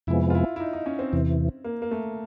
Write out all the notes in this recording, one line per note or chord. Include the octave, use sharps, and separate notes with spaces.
F2 C3 F3 G#3 B3 E4
F4
E4
E4
D#4
D#4
C#4
C4
E2 C3 E3
A#3
A#3
A3